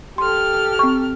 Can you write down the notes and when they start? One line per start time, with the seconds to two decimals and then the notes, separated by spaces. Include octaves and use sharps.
0.18 G4 A4 C6 F6
0.79 C4 C#6